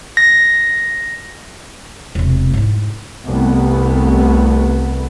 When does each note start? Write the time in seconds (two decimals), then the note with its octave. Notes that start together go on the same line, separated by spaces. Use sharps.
0.17 A#6
2.15 E1 C3
2.53 G#2 E4
3.27 C2 A3 B3